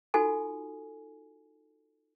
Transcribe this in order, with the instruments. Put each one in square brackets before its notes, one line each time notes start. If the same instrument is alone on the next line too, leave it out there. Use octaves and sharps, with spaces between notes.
[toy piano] D#4 F4 F#4 A4 G#5